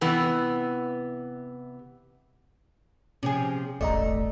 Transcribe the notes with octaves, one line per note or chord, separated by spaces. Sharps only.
C3 E3 B3
C3 F3 C#4 G#4
D#1 G#1 A3 D5 D#5 A#5